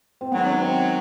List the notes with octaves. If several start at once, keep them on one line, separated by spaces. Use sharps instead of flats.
C4
G#2 D#3 F#3 B3
C#4
C4